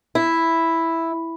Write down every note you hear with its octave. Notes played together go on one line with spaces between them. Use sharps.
E4